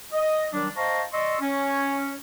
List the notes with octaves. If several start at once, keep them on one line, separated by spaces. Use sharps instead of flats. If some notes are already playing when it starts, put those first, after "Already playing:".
D#5
D#3 F#3 G3 D4
C5 D#5 F5 A5 A#5 C#6
D5 D#5 C6 C#6 E6
C#4